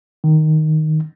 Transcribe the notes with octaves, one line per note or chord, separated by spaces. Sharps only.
D#3